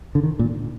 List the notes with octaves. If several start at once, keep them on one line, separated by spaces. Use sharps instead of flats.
D3
D#3
A#2